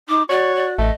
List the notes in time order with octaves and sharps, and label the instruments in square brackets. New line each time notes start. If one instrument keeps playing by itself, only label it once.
[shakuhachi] D#4 [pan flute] D6
[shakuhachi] F#4 [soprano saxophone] C#5 [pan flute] D5
[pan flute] D5
[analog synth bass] A1 [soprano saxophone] A3 [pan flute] D#5